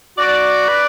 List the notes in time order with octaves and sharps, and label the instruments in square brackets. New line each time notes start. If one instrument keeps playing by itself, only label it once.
[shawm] F#4 [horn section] D5
[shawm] B4